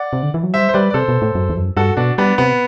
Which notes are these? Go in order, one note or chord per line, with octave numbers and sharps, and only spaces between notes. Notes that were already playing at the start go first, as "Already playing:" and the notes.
Already playing: D5 F#5
C3
D3
E3
F#3
G3 C5 E5
C5
G3 B4 D5
D5
C3 A4 C5
B2
A2
F#2
E2
F#2
G2 F#4 A4
B2 D4 F#4
G3 B3 D4
C3 B3